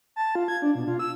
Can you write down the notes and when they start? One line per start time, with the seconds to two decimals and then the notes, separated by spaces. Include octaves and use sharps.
0.16 A5
0.35 F4
0.48 G#6
0.62 D4
0.75 B2
0.88 F4
0.99 E6